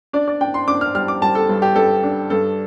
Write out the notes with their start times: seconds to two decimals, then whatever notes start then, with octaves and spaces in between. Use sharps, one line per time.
0.13 D4 D5
0.28 D5
0.41 D4 G5
0.54 C6
0.68 D4 D6
0.81 F6
0.95 G3 F6
1.08 D6
1.22 G3 A5
1.35 A4
1.49 G2
1.62 G4
1.76 G2 A4
2.03 D4
2.30 G2 A4